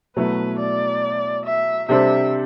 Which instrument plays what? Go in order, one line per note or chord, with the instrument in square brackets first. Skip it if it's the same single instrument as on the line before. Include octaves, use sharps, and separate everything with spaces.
[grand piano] B2 F#3 A3 E4 [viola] B4
[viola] D5
E5
[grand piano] C3 G3 D4 A4 C5 [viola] E5